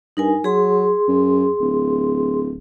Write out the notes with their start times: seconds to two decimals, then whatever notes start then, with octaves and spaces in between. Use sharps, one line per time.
0.17 G2 D#4 A#4 G#5
0.44 F#3 G#4 C6
1.08 F#2
1.60 D1